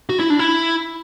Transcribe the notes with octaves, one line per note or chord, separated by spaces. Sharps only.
F#4
E4
D4
E4